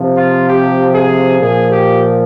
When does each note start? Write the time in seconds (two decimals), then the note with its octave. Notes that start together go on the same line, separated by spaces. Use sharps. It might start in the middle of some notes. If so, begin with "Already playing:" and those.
Already playing: C3 F3
0.16 F4
0.47 G4
0.94 G#4
1.40 A#2 F3 G#4
1.72 G4